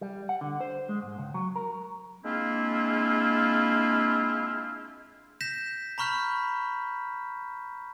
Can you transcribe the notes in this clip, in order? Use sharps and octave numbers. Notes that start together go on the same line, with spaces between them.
G3
F#5
D3
C5
G#3
G#2
C#2
F#3
A#4
G#3 A#3 C4 D4 E4 F4
G6 A#6 B6 E7
A#5 B5 C#6 F6 G6 B6